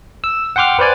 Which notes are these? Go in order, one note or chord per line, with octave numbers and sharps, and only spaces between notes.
E6
F#5 G5 C6 D6 F6
B4 C5 D5 G#5